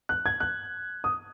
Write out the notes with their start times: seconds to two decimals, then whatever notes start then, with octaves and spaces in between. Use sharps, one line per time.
0.09 F#6
0.26 G#6
0.40 F#6
1.04 D#6